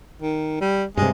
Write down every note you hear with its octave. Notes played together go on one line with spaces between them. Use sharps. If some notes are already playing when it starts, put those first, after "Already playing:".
D#3
G3
G2 C3 G#3